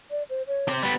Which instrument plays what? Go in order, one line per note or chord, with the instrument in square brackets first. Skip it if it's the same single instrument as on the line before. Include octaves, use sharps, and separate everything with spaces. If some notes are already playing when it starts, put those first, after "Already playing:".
[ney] D5
C5
C#5
[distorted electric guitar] G4 C6
[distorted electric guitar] G3 B3 [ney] B5